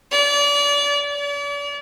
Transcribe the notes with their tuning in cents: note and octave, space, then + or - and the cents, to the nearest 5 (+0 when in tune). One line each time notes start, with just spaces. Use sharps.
D5 -35
D5 -40